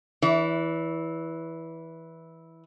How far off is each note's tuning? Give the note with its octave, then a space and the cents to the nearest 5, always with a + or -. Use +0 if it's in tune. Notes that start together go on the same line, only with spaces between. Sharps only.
E3 -10 D5 -45